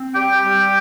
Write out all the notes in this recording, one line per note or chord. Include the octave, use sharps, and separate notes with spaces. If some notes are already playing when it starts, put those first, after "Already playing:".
Already playing: C4
G3 G4 G5
G3